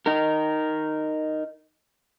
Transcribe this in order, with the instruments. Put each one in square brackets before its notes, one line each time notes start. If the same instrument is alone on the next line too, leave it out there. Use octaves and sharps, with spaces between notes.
[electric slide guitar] D#4 A#4